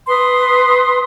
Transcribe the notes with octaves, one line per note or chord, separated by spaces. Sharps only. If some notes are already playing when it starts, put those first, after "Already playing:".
B4 C6 D#6